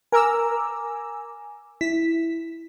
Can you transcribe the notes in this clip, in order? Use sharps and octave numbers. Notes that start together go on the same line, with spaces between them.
A#4 G#5 A#5 D6 E6
E4 B6